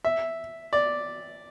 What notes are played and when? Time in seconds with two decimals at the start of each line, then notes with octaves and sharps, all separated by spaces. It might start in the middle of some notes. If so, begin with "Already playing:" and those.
0.05 E5
0.73 D5